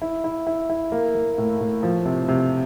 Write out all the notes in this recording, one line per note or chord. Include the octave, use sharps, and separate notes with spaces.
E4
E4
E4
E4
A#3
A#3
A2
A2
F3
C3
C3